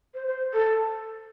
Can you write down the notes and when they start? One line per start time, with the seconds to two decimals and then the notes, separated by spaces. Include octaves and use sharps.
0.14 C5
0.27 C5
0.53 A4